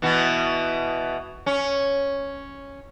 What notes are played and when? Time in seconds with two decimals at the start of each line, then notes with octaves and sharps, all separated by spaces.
0.02 B2 E3 B3
1.46 C#4